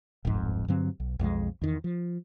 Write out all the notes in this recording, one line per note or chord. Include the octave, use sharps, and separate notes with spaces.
D1 G1 F2 G#2
G2 D3 F#3 C4
B1
B1 F2 E3 G#3
E2 D#3
F3